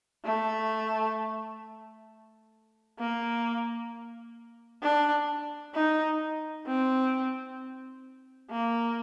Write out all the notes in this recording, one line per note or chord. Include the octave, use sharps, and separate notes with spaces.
A3
A#3
D4
D#4
C4
A#3